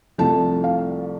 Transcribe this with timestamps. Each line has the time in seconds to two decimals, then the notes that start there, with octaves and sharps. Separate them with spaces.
0.18 C2 C3 F3 A3 A5
0.64 F5